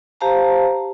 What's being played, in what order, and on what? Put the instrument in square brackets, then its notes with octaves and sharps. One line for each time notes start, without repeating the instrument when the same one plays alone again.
[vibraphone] G4 C5 F5 A5 A#5